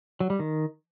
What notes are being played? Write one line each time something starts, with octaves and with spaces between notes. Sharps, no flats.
F#3
G3
D#3